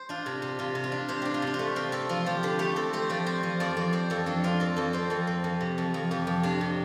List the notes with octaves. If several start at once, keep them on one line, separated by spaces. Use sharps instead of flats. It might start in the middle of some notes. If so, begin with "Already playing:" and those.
Already playing: C5
D4 F4
C3
C3
C3 F4
C3
F4
D4
C3 C5
D4 G4
F4
C3 D4
F4
A3 G4
C4 F4
C4 A4
F3 F4
F3 G4
D3 G4
A3 G4
C4 A4
A3 C5
F3 D5
C4 C5
F3
F2 D5
F2 D5
C4 C5
F2 A4
F2 D4
C4 F4
C4 A4
F2 A4
C4 C5
F2 A4
C4
F2
C3
F2
F2
F2 G4
F2
C3 D4
C3